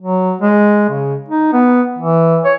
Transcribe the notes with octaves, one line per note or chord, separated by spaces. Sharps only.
F#3
G#3
C#3
D#4
B3
E3
C#5